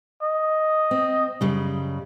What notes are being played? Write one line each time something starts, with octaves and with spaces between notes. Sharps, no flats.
D#5
C4
F#2 C#3 G3